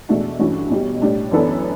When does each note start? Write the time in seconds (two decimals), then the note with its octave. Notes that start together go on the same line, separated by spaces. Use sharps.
0.09 E2 B2 A3 D4 F#4
0.39 G2 E3 A3 C#4 F#4
0.70 B1 B2 G3
1.02 A2 G3 D4
1.31 F#2 E3 B3 D4 A4